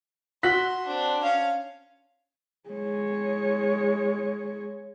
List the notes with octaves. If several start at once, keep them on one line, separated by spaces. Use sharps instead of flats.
F#4 C6 F#6 B6
C4 D4
C#4 F5
G#3 C#5